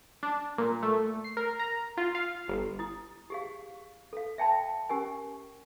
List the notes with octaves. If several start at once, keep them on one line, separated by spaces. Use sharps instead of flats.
D4
A#2
A3
C7
A#4
A#5
F4
F5
G1
E4 D#6
G4 G#4 F5
A4 F5
E5 G5 A5 B5
C#4 G4 A#4 G#5